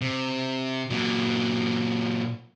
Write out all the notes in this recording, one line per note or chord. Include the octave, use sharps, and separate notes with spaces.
C3
A#2 F#3